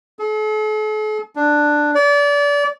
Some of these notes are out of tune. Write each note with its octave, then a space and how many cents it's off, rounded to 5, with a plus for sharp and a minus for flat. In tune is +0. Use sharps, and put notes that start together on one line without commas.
A4 -45
D4 +10
D5 -30